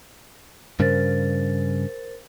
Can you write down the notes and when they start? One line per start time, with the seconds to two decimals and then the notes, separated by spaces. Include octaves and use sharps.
0.80 G2 C#3 A#4 C5 A6